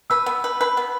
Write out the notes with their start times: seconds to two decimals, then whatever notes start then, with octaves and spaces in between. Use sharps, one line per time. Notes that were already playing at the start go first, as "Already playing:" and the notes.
0.10 B4 E6
0.26 B3
0.44 B4
0.61 B4
0.77 B3